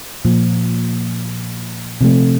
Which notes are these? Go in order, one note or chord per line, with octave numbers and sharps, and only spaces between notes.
A#2 F3 A#3
C3 F3 A3